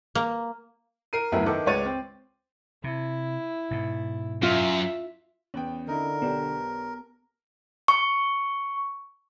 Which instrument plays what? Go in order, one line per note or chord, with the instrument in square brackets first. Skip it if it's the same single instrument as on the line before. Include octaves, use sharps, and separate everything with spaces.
[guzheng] A#3
[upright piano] A#4 C7 D#7
F#1 D2 B3 E4 A#4
D#3 A4 B4 E5 D6
C#2 G#3 B4 C#5 A6 D#7
C4
[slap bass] C3 [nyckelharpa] E4
[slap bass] G#2 B2
[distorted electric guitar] F#2 [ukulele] F4 [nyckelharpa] E5
[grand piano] E2 B3 G5 [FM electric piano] C#4
[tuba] D3 [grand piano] D#4 E4 [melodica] A#4
[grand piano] B1 D4 G4 [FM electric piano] B3
[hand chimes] C#6